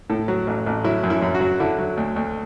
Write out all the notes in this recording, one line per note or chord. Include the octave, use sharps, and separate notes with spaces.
A2 A4
F#3
A1
A1
F#3 E4
F#2
E4
F#2
F#4
F#3
D3 E4
F#3
D2
D2